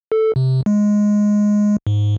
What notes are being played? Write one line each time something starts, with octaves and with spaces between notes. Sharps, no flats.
A4
C3
G#3
G#2